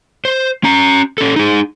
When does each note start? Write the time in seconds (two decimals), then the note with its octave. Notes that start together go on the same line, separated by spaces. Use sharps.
0.25 C5
0.64 C#4 A#5
1.18 C#4 A4
1.36 D#4 G#4